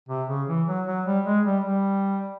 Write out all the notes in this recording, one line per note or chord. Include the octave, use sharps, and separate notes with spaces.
C3
C#3
E3
F#3
F#3
G3
G#3
G3
G3